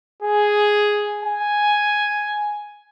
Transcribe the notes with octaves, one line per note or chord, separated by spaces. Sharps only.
G#4
G#5